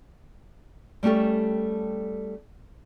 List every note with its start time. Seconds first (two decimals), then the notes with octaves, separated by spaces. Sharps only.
1.03 G3 A3 C#4 G4 A4